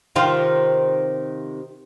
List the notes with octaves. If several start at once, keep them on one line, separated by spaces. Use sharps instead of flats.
C3 D#3 F4